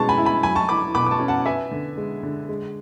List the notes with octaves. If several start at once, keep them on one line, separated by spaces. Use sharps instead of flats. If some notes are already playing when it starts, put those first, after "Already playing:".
Already playing: B2 G#3 C#4 A5 C#6
G#5 B5
E4
G#5 B5
F#3 G#5 B5
A5 C#6
E2 B5 D6
B2 B5 D6
D6
A5 C#6
C#4
F#5 A5
B3 E5 G#5
D3
G#3
D3
G#3